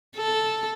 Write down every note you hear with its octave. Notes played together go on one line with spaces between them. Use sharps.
A4